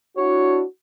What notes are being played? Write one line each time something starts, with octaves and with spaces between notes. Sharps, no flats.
D4 E4 F#4 C#5